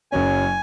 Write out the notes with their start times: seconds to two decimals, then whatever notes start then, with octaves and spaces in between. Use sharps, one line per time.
0.12 F#1 F#2 F#3 C#4 G#5